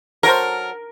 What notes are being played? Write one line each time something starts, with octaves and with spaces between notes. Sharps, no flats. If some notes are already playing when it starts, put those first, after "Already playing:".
F#3 A4 A#4 C5